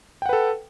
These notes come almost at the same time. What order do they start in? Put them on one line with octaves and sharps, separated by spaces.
G5 F#5 B4 A4